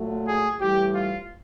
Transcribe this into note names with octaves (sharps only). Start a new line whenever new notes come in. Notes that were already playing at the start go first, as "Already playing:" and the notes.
Already playing: A#2 F#3 A3
G#4
A2 E3 G3 G4
F4